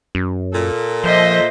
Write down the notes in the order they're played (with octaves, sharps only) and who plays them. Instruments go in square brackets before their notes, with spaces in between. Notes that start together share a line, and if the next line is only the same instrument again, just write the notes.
[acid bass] F#2
[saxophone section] A#2 A4
[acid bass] F3 [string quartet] C5 D#5 E5